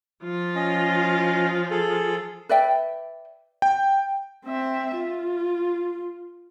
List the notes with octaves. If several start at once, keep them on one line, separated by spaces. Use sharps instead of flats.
F3 F4
C#4 D#5
G#4 A4
B4 D5 E5 G5
G5
C4 E5
F4